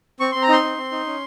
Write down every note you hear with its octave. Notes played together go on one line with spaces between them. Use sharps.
C4 C#6
C4 C6
A#5
D#4 C6
C4
C4
D#4
C#4